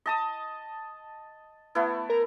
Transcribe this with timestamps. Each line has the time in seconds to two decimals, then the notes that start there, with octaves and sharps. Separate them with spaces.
0.06 D#5 A5 D#6
1.75 A3 B3 E4
2.09 A#4